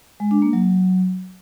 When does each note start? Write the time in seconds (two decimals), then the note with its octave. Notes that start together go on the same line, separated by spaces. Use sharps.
0.20 G#3
0.31 D4
0.42 A#3
0.53 F#3